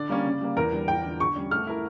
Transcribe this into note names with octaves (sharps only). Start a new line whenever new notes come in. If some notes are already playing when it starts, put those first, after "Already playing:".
Already playing: D3 D5
G3 A#3 C#4
C#3
G3 A#3
E2 A#4
D3 G3
E2 G5
D3 F3
D3 C#6
G3 C#4
A3 F6
E4 A#4